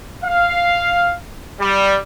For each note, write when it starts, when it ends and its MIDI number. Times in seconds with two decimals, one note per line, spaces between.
0.23 1.15 77
1.59 1.96 55